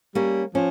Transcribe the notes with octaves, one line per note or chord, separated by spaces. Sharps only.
G3 A#3 C#4
F3 C#4